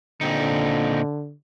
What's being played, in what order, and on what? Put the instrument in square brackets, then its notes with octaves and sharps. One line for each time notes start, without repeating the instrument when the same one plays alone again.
[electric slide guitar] A#2 C4 D#4 [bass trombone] D3